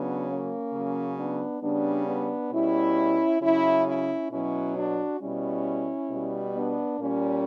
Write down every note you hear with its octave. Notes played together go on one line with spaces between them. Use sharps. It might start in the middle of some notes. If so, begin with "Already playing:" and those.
Already playing: C#3 F#3 B3 D4
A#3 C#4
C#3 F#3
B3 D4
C#3 G3 B3 D4
B3 D4
B2 G3 C#4 E4
C#3 F#3 C#4 E4
C#4 E4
B2 F#3 C#4 E4
D4 F#4
B2 G3 C#4 E4
B2 G3
B3 D4
A#2 G3 A#3 C#4